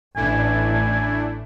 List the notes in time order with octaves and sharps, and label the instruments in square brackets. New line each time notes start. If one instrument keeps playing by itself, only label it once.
[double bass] A1 [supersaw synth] A3 D4 E4 [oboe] G#5